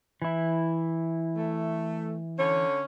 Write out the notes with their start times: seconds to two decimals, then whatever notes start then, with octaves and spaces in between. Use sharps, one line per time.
0.22 E3 E4
1.36 A3
2.39 D3 C#4 C#5